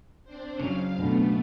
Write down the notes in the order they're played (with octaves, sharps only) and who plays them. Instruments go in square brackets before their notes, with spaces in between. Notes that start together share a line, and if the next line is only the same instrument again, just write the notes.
[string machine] C4 D4 C5
[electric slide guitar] C#3 F#3 [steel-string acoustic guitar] C#4 [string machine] F5
[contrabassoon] D2 [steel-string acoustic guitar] B2 [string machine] A3 B3